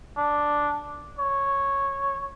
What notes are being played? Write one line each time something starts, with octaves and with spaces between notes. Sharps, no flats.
D4
C#5